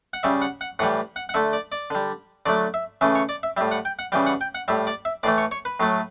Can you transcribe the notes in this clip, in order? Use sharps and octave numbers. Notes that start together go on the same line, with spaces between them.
F#5
C#3 G3 E5
F#5
F#5
A2 E3 G3 F#5
F#5
F#5
D3 A3 E5
D5
D5
D3 G3
D3 F#3 A3 D5
E5
C#3 E3 A3 E5
C#5
D5
E5
A2 G3 E5
F#5
G5
F#5
C#3 E3 G3 G5
F#5
G5
F#5
A2 G3 E5
D5
E5
A2 E3 A3 D5
C#5
C#5
B4
A2 F#3 A3